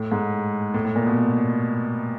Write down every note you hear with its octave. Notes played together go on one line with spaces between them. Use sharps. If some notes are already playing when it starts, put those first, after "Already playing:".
Already playing: A2
G#2
A2
A2
A#2
B2